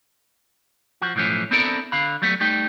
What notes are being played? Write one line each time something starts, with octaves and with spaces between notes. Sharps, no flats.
F3 F#4
B1 A2 E3 F3 A3 C#4
B3 C4 D4 E4 A4 A#4
D3 F5 B5
F#3 G3 A3 B3
G3 A3 D#4 G5